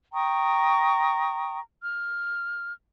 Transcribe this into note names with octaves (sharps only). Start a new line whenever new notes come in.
G5 A#5 C#6 D#6
F6